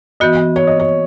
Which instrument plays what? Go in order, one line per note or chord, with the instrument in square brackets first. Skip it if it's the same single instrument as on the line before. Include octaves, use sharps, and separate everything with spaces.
[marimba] E3 B3 F#4 [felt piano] D#5
[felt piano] C#5
D#5
C#5